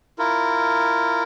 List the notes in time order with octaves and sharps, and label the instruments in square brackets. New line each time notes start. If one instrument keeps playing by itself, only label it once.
[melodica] E4 F4 A#4